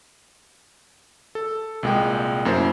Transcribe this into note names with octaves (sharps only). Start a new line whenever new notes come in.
A4
C2 A#2 G#3 D#5 G5
F#2 A#3 E4 C5